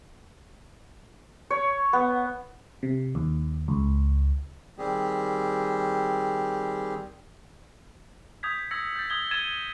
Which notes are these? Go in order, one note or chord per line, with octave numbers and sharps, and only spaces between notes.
C#5
B3
C3
D#2
C#2
D#3 G3 C4 G4 G#4
D#6 G6 G#6 B6
E6 G#6 A#6 C#7
G6 A6
D#6 G#6 G7
E6 G#6 A6 D#7 E7 G7